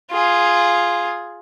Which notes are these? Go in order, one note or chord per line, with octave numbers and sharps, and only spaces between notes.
F4 G#4